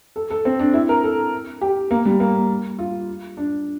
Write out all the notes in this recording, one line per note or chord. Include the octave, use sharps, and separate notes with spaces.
A4
A4
C4
D4
E4
A#4
A4
G4
A#3
G3
A#3
F4
D4